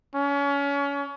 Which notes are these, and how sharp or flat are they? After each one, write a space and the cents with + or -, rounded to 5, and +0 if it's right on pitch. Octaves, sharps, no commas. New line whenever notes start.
C#4 +30